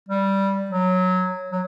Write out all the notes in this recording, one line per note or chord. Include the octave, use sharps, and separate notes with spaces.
G3
F#3
F#3